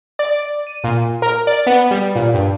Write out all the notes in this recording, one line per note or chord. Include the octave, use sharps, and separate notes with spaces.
D5
D#7
A#2
A#4
D5
B3
G3
A#2
G2